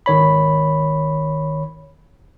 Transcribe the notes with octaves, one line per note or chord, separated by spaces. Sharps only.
G#1 D#3 C#5 B5